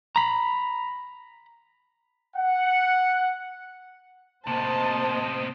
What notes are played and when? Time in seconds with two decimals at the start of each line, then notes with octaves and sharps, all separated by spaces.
0.16 A#5 B5
2.37 F#5
4.47 A2 C3 A#3 C5 D#5 A5